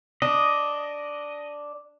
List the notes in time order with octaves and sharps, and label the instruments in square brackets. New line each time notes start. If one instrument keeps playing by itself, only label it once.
[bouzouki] D4 [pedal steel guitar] D#5